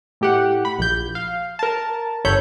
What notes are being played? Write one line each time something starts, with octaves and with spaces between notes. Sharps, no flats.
A2 G4 F#5
B5
A#1 G6
F5
A#4 A5
G1 A4 C#5 B5 G6